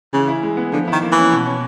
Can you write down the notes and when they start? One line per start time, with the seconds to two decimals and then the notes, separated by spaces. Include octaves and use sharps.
0.13 C#3 E3
0.28 E4
0.43 G#3
0.57 B3
0.72 D3 F3
0.88 D#3 E4
1.01 A#3
1.12 E3
1.17 C#4
1.32 B2
1.46 C#4